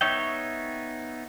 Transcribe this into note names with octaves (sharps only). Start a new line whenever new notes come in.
B3 D#4 C#5 E5 G5